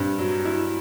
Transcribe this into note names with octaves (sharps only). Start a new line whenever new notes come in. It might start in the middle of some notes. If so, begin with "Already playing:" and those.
Already playing: G2 C4 D4
F#3
E4